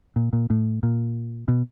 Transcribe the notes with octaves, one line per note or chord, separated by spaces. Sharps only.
A#2
A#2
A2
A#2
B2